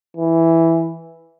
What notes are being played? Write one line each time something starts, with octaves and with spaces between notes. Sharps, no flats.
E3